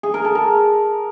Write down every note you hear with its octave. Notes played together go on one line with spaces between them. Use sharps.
G#4
A#4
A4
A#4